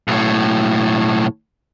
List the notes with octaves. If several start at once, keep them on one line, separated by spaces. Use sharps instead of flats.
B1 A2